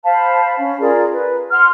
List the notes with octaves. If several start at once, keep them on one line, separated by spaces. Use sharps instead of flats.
C5 F5 A5 B5
C#4
F4 G#4 A#4 D5
B4
F#5 C6 F6